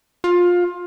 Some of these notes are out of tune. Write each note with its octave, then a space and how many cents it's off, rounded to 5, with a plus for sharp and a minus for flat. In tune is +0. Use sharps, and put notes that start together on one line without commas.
F4 +20